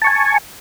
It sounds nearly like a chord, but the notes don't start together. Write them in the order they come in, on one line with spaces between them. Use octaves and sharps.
A5 C#6 G#5